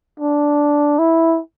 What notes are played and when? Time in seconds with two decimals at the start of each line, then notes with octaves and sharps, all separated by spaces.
0.20 D4
0.99 E4